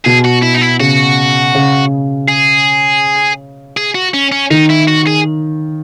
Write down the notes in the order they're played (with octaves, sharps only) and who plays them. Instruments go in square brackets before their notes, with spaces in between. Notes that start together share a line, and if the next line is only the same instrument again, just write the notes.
[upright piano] B2 [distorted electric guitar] G#4
[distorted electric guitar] F#4
E4
D#4
E4
[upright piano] C#3 [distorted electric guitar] F#4
[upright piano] C#3
[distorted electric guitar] G#4
G#4
F#4
C#4
C#4
[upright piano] D#3 [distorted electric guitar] D#4
[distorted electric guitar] E4
F#4
G#4